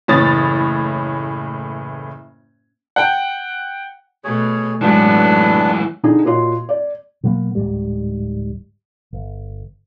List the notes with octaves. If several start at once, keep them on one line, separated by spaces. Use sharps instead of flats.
F#1 A2 E3 C#5 D#6 A6
F#5 G5
B2 A3 G#4 C#5
F#2 A2 E3 F#3 G#3 B3 D4
D3 D#4 G#4
A#2 F#4 C#5 D#5 C6
D5
B2 F#3 G3 A#3
D1 G#2 G3
G1